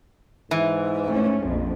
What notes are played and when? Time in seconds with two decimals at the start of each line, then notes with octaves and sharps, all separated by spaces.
0.51 G#2 E3
1.08 A3 C#4
1.44 A#1 F2